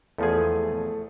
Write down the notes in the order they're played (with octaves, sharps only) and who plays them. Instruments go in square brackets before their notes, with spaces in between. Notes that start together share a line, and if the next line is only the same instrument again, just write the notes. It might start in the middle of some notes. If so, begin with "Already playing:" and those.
[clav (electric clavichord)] E2 F3 G#4 [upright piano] A3